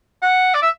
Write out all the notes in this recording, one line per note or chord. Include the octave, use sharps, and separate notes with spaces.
F#5
D5
E5